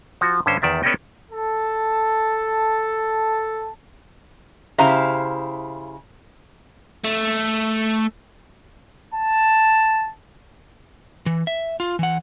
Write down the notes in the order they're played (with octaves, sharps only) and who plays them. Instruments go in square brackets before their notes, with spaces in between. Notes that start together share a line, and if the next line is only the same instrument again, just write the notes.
[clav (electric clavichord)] F3 F#4
G2 D3 C#4 C5
E2 D#3 D5 E5
B3 C#4 A4 D5 D#5 G5
[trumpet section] A4 A5
[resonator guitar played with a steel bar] C#3 E4 G4 C5 F5 A#5
[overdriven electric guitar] A3
[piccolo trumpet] A5
[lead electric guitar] E3
E5
F4
E3 F#5